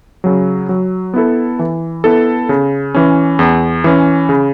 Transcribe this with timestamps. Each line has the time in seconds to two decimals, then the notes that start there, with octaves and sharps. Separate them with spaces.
0.24 C#3 F#3
0.69 F#3
1.14 B3 E4 A4
1.59 E3
2.04 B3 E4 A4
2.49 C#3
2.95 E3 C#4
3.39 E2
3.84 E3 C#4
4.29 C#3